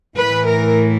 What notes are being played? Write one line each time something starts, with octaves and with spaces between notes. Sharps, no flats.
A2 E3 B4
A#4